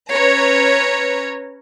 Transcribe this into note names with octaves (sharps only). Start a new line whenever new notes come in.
C#4 B4 C#5 A#5